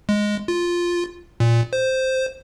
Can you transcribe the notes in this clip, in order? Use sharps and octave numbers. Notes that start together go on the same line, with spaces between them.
G#3
F4
A#2
C5